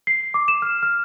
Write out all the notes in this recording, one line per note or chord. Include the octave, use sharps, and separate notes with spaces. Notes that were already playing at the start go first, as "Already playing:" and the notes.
C7
D6
E7
F6
F6